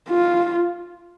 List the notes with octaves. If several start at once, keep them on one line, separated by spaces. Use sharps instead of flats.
F4